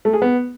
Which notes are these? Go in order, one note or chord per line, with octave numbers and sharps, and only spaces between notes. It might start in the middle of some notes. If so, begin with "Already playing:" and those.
A3
G#4
B3